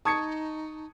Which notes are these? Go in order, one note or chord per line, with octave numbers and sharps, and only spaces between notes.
D#4 A5 C#6 D#6 G#6 C#7